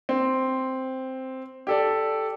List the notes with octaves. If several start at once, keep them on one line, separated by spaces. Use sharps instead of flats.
C4
G4 A4 D5